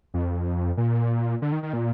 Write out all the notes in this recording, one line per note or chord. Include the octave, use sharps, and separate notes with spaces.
F2
A#2
D3
D#3
D#3
A#2